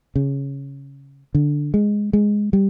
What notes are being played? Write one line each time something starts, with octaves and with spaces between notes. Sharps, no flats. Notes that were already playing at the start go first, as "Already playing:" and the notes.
C#3
D3
G#3
G#3
G3